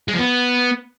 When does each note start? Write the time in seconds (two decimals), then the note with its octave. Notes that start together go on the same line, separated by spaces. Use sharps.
0.08 G#3
0.13 F3
0.19 B3